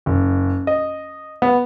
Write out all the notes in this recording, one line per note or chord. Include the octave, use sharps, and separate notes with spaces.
F#1
D#5
B3